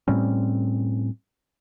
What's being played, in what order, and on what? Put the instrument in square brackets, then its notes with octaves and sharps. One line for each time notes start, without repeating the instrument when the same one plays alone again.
[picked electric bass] A2 G3 C4 C#4